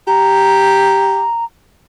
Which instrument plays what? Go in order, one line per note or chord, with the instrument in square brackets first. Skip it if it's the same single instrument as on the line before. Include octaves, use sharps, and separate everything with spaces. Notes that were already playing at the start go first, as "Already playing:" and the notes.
[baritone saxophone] G4 [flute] A#5